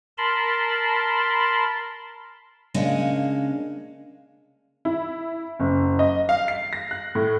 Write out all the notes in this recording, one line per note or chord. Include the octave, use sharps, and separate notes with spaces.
A#4 A5 B5 C6
C#3 G#3 A#3 C#4 D4
E4
F#1
D#5
F5
C7
A#6
F#6
A2